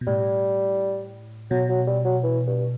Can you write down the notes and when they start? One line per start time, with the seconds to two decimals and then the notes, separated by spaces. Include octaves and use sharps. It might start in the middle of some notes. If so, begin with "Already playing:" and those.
0.01 B2
0.07 A2 G3
1.51 B2 F#3
1.69 F#3
1.87 G3
2.05 F#3
2.23 E3
2.47 G2